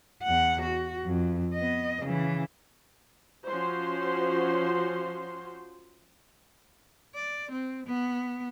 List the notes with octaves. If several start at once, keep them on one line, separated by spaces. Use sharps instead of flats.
E2 F#5
F#4
F2
B3 D#5
C#3 E3
F3 C#4 F#4 C5 C6
D5
C4
B3